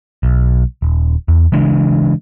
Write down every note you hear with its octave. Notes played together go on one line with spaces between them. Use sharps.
B1
D#1
E2
C#3 E3 G#3 D4